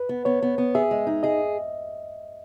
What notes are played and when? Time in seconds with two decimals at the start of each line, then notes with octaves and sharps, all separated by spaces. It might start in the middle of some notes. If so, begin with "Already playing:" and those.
Already playing: B4
0.09 B3
0.25 B3 C#5
0.42 B3
0.58 B3
0.75 G#4 E5
0.91 G#3
1.07 D#4
1.23 G#4 D#5